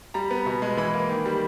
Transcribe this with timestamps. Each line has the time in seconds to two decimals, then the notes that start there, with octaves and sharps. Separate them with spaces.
0.14 G3 A#5
0.31 B3
0.46 B2
0.62 G#3
0.77 E3 B5
0.94 A#3
1.09 D#3
1.26 G3